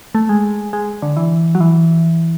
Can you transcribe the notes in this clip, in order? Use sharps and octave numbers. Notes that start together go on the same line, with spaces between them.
A3
G#3
G#3
D3
E3
F#3
E3